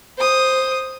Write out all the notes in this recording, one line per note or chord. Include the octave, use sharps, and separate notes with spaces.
C5 D#6